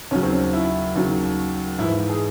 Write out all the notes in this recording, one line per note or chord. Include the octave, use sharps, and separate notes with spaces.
D#2 C#3 F#3 C#4
C4
C#4
E4
D#2 C#3 F#3
G#2 E3 E4
G#4